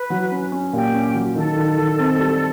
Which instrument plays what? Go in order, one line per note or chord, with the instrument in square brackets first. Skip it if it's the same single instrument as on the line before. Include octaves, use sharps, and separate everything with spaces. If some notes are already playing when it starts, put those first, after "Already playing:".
Already playing: [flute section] B4
[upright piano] F#3
C#4
C#4
[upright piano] A#2 [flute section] G4
[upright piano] C#4
F#3
[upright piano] D#3 [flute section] A4
[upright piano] D#3
D#3
C4
G3